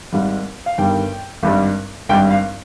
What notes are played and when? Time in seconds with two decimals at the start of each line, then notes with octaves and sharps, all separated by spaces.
0.12 G#1 G#2 G3
0.66 F5
0.78 G1 G2 D#3 G3 G5
1.43 G#1 G2 G3
2.09 G#1 G2 G3 G5
2.31 F5